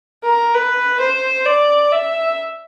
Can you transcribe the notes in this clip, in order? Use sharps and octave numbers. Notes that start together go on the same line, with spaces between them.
A#4
B4
C5
D5
E5